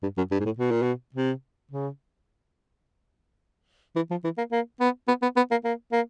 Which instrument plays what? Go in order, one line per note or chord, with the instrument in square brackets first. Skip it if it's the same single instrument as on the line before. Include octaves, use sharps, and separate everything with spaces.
[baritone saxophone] G2
F#2
G2
G#2
A2
B2
A#2
B2
C3
C#3
E3
F3
E3
A#3
A#3
B3
B3
B3
B3
A#3
A#3
A#3